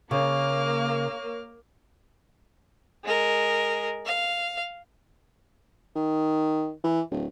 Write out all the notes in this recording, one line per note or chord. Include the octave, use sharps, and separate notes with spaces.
C#3 A#3 C#5 C#6 D6 F6
G#3 A#4
F5
D#3
E3
D1